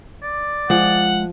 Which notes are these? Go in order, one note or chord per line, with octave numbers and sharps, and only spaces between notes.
D5
F3 G#3 F#5